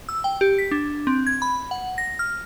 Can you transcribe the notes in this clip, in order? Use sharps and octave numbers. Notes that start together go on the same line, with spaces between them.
E6
G5
G4
B6
D4
C4
G#6
B5
F#5
A#6
F6